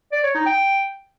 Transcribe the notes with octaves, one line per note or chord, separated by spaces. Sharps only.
D5
C#5
D#4
G5